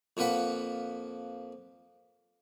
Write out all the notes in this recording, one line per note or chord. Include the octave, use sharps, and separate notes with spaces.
F2 F3 A#3 B4 F#5 B5